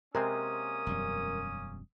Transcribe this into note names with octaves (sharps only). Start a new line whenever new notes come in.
C3 G#3 A#3 C4 C#4 A#4 D#6
E1 F#2 G3